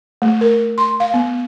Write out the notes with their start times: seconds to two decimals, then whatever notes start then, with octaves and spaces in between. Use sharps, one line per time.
0.22 A3
0.41 A#4
0.78 C6
1.00 F5
1.14 B3